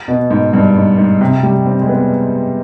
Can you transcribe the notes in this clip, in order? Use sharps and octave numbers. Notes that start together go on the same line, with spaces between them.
B2
G#2
G2
G#2
G#2
C3
G3
C4
G#3
B3